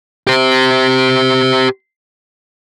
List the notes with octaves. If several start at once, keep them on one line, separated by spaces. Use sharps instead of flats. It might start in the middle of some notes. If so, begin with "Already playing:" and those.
G4 C5